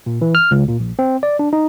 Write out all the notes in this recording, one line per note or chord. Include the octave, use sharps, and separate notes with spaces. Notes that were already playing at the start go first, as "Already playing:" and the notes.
A#2
E3
F6
C#2
A#2
A#1
C4
D5
D4
D#4